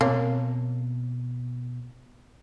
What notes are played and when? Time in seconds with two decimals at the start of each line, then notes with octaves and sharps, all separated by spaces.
0.01 B2 A#3 C4 C#5